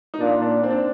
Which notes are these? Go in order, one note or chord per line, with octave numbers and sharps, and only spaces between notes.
D#4
A#2 D4
D4
C4
D4
C4